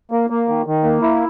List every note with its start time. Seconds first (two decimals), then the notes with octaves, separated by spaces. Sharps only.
0.11 A#3
0.30 A#3
0.48 D#3
0.66 D#3
0.84 A#3
1.02 E4